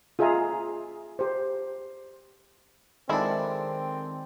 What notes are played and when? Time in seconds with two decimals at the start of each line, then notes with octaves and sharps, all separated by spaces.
0.19 F4 G#4 D#5 E5 G#5 A#5
1.19 G4 C5
3.09 D#3 F3 G#3 C4 D4 E4 A4